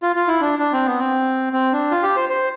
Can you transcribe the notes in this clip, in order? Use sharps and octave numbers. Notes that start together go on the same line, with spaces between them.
F4
F4
E4
D4
D4
C4
B3
C4
C4
D4
F4
G4
C5
C5